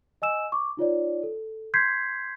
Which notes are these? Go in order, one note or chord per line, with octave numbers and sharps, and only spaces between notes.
D#5 G#5 E6 E7
C#6 D6
D#4 F4 C#5 D5
A4
C6 G6 G#6 B6 C7